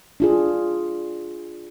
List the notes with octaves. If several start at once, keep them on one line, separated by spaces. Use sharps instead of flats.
D4 F4 G#4